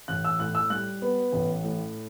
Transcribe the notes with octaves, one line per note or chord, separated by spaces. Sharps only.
A1 F#6
E6
A2 F#6
E6
G3 F#6
B3
A1
A2